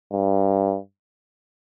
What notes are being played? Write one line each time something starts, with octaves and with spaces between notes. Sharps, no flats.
G2